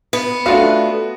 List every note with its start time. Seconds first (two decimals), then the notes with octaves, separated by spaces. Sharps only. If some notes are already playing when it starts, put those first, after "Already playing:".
0.13 B3
0.46 A3 D4 F4 F#4 F5